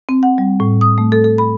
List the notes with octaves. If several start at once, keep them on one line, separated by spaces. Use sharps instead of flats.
C4
F#5
G3
A2
D#6
A3
A4
A4
B5